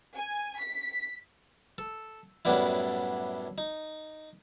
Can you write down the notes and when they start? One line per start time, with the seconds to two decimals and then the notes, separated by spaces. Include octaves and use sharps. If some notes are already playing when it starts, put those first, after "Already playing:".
0.17 G#5
0.60 B6
1.78 A4
2.45 F#2 A2 G3 B3 D4 E4
3.58 D#4